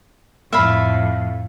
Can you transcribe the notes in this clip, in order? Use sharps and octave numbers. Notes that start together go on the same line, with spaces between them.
F2 A2 E5 F5 B5